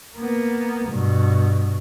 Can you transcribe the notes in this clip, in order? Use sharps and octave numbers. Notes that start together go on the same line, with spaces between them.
A#3 B3
G2 B2